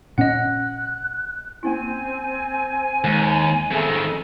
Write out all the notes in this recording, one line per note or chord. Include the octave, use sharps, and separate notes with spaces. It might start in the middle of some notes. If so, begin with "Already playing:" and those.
A#2 C#4 D#5 F#5 F#6
A#3 C4 C#4 E4 G#5
D#2 G#3
F2 D#3 G#4 A4 E5 A5